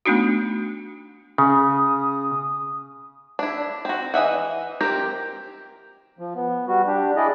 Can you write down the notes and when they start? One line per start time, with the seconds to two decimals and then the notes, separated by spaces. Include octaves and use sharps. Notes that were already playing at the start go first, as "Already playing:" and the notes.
0.06 A3 B3 D4 D#4 F#4
1.38 C#3 D#6
3.39 D4 E4
3.85 C4 F#4
4.14 E3 D#5 E5 F#5
4.81 C4 G4 A#4
6.19 F3
6.35 B3
6.68 G3 F#4
6.87 D4 G4
7.16 E4 G#4 D5 D#5